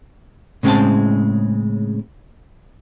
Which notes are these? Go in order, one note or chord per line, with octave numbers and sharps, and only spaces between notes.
A2 C#3 G#3 C4 G5 A5